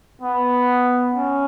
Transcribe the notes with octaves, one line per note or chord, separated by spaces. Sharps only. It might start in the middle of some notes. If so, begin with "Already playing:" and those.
B3
C#4